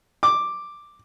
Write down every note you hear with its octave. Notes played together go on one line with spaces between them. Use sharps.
D6